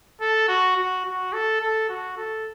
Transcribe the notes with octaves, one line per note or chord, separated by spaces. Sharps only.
A4
F#4
F#4
F#4
A4
A4
F#4
A4